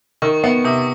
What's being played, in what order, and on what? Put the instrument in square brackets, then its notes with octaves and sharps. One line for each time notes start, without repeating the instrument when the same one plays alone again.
[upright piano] D#3 [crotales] C#6
[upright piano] B3
[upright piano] C3 [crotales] D#6